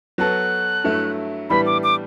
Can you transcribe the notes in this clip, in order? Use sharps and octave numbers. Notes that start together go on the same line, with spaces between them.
F#3 B3 F#4 A4 F#6
G2 F#3 A3 E4
A2 E3 G3 B3 D4 B5
D6
D6